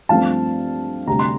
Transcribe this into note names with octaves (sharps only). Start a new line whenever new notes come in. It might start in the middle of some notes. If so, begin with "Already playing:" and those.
G2 F3 A3 C4 F5 A5
D2 C3 G3 A#5
C6